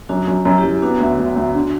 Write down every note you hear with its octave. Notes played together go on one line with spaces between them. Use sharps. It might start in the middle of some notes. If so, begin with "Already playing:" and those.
F#2 D4 F#4
F#2
F#2
E4 G4
F#2
B3 D4 F#4
D2
D2
D2
D3